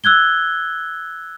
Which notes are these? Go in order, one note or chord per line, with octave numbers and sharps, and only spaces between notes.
E6 F#6 G#6 G7